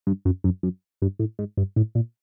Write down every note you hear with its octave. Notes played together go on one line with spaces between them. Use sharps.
G2
F#2
F#2
F#2
G2
A2
G#2
G2
A2
A#2